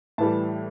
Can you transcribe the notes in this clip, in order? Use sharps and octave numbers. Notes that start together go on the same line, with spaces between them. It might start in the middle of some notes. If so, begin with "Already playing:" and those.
A2 E3 G3 A5